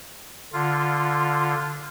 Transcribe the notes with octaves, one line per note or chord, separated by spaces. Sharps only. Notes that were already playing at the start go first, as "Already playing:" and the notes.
D3 F4